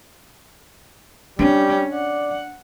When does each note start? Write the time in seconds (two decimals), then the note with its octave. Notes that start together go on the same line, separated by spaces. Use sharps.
1.39 G3 C#4 D4
1.93 D5 F#5